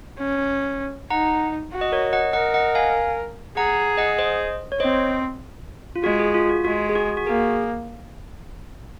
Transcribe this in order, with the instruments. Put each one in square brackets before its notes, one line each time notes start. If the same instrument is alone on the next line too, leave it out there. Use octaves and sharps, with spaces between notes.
[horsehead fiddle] C#4
[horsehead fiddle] D#4 [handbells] F#5 A#5
[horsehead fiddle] F#4
[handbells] D#5
A#4 C#5
D#5 F#5
[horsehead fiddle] A#4 [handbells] D#5 F#5
[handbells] D#5 F#5
F5 G#5
[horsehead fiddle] G#4 [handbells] F#5 A#5
[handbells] D#5 F#5
C5 D#5
C#5
[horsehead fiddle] C4 [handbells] C5 D#5
[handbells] F4
[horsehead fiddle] G#3 [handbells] F#4
[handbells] G#4
F4
F#4
[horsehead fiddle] G#3 [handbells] F#4
[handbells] G#4
F#4
F#4
[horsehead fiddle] A#3 [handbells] G#4